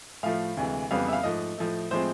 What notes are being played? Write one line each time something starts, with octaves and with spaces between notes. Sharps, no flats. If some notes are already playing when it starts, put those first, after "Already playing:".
A2 F3 A3 F5
D2 C3 E3 G#3
F2 C#3 E3 G3 B3 F5
E5
F5
G#2 F3 A3 D#5
A2 F3 A3
A2 F3 G#3 C4 C5